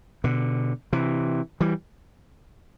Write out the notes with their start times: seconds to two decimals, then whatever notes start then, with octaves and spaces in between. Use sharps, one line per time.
0.24 B2 D3
0.93 C3 E3
1.61 E3 G3